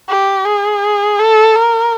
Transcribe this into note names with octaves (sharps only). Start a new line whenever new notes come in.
G4
G#4
A4
A#4